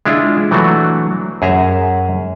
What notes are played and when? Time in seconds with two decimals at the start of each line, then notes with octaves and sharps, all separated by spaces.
0.06 G#3 D4 E4 F4
0.51 E3 F#3 A3 D4 F#4
1.42 F#2 G#4 E5 A#5